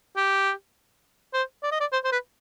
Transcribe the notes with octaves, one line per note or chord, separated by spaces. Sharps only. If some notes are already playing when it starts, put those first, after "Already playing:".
G4
C5
D5
D#5
D5
C5
C5
B4